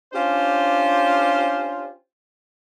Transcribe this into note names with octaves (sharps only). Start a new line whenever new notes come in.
C#4 D4 F4 G4 C5